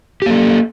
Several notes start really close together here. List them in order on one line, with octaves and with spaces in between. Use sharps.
G4 A#3 A4